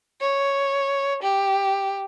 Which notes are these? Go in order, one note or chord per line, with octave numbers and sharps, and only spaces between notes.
C#5
G4